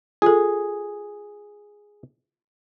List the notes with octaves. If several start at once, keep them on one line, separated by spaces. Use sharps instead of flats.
F4 G#4 A4